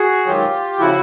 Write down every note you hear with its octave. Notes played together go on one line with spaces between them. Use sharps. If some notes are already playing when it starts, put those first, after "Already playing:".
Already playing: F#4 G#4
G#2 D#3 F#3 F4 G4
C#3 F3 E4 F#4